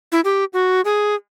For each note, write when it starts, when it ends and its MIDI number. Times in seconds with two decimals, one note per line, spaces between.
0.12 0.20 64
0.24 0.44 67
0.53 0.81 66
0.85 1.15 68